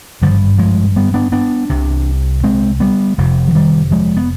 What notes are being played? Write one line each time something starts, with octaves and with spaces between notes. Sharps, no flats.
G#1 G2 D3 F3
F3 G#3
G3 B3
B3 D4
B3 D4
C2 C3
G#3 C4
G3 B3
F1 F2 C3
F3
D#3 G3
F3 G#3
B3